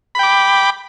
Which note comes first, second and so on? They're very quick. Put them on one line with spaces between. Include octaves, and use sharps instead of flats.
B5 G5 D6